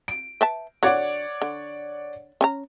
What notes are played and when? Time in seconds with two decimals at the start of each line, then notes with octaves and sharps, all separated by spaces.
0.08 D7
0.41 B4 E5 A5
0.83 D3 F#4 C#5 D5 F#5
1.42 D3
2.41 C#4 G#5 A#5